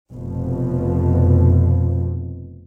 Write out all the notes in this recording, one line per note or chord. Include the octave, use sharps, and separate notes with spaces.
F1 B2 F3